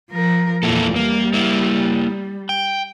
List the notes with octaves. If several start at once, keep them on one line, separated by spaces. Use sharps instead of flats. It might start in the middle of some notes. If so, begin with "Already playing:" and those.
F3 A#4
E2 A#2 A#3 E4 A4
G3 A#3
A#3 E4
G5